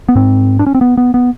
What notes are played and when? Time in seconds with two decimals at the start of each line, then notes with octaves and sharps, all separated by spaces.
0.09 B3
0.15 G#2 C4
0.59 D4
0.66 C#4
0.75 C4
0.81 B3
0.97 B3
1.14 B3